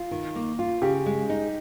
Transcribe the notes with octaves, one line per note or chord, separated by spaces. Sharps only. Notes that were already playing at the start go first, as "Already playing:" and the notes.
Already playing: F4
D#3
A#3
F4
C#3 G4
G#3
D#4